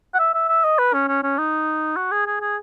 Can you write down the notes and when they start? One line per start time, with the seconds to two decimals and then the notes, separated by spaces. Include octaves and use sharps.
0.14 F#5
0.19 E5
0.34 E5
0.49 E5
0.64 D#5
0.78 B4
0.93 C#4
1.08 C#4
1.23 C#4
1.38 D#4
1.97 F#4
2.11 G#4
2.27 G#4
2.41 G#4